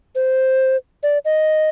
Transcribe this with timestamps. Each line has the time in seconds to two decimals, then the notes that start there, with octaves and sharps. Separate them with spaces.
0.15 C5
1.03 D5
1.25 D#5